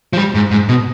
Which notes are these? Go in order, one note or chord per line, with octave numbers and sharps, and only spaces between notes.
F3
G3
G#2
G#2
B2